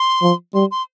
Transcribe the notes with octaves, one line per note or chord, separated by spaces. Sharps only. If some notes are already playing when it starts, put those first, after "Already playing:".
Already playing: C6
F3
G3 C6
C6